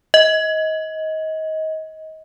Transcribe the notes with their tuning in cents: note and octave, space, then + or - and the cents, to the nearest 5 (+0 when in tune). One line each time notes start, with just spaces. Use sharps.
D#5 +25